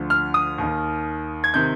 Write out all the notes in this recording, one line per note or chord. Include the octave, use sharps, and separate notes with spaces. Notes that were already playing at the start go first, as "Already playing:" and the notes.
Already playing: D2 D3 F3
F6
D#6
D#2 D#3
G#6
C3 D#3 G6